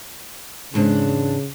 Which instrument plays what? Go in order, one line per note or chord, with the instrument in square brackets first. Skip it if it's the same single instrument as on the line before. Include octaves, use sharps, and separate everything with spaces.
[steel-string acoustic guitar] E2 G#2 D4 [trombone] C#3